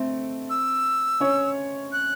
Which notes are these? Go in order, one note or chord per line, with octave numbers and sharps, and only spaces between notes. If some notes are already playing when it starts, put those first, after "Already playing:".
Already playing: A3 C4
E6
C#4 C#5
F#6